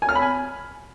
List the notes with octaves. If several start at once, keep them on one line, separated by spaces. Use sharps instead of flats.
G#5
F6
B5
G#5